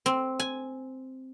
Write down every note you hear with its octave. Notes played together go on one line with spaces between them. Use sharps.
C4
G#5